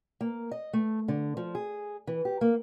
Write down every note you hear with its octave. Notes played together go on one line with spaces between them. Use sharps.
A#3
D#5
A3
D3
F3
G#4
E3
G4
A#3